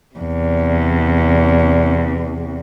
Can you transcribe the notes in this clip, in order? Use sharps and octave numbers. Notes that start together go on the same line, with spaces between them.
E2 C3